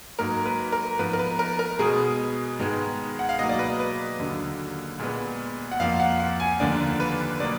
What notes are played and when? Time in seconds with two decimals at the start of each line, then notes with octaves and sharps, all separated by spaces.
0.19 G#2 F#3 A#3 A#4
0.45 B4
0.72 A#4
0.99 G#2 F3 B3 B4
1.13 A#4
1.19 B4
1.39 A#4
1.59 A#4
1.79 B2 G#3 B3 G#4
2.59 G#2 D#3 G#3 B3
3.19 F#5
3.29 F5
3.39 B2 F#3 A#3 D#5
3.49 D5
3.59 B4
3.80 B4
4.19 D#2 D3 F#3
4.99 A#2 G#3 B3
5.71 F#5
5.80 F2 F3 A#3 F5
6.00 F#5
6.20 F#5
6.40 G#5
6.60 D#2 D3 F3 A#3 D5
7.00 B4
7.40 B2 F#3 A#3 D5